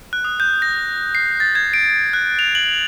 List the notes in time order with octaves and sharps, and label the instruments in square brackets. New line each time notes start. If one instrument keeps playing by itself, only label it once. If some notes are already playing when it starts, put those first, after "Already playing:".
[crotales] F#6
D#6
G6
A#6
C7
A6
G#6
D7
F#6
F7
F#7